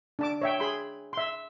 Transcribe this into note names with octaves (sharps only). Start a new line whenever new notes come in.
D4 A5 D6
C#5 E5 G5
G#4 B5 C6
E5 C6